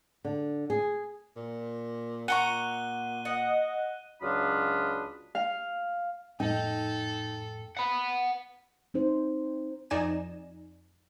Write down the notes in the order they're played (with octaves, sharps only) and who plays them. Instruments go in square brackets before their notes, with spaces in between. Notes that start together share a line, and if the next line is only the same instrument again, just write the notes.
[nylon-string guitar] D3
G#4
[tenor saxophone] A#2
[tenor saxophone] A#2 [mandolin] F#5 A#5 C#6 [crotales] F#6 D#7 G7
[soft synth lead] D#5 [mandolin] F#5
[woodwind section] C#2 F#3 D4 F4 B5 D#6
[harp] F5
[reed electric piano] F2 A2 G5 [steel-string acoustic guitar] D#4 [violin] A4
[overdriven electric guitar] F#5 B5
[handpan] C4 D#4 C5
[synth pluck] F2 D#4 D5 G#5 A#6 E7